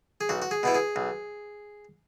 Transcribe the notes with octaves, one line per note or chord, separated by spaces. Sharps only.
G#4
B1 F#4
F#4
G#4
B2 B3 E4
G#4
B1